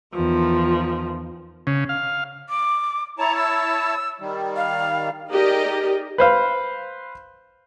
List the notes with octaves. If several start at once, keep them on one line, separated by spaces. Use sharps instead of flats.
E2 D#3 F3
C#3
F5
D6
E4 C#5 A5 A#5
E6
D#3 G3
F5
D#4 G4 G#4 A#4 D5 D#5
B4 C5 F5